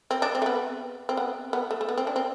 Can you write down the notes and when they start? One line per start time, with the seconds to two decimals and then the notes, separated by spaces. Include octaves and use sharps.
0.11 C4
0.22 D4
0.35 C4
0.42 A3
0.46 B3
1.09 C4
1.17 B3
1.53 B3
1.71 A3
1.81 A3
1.89 B3
1.98 C4
2.07 D4
2.16 C4